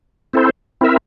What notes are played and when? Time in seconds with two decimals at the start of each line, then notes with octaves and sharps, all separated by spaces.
0.33 C4 E4 A4 C5
0.81 C4 E4 A#4 E5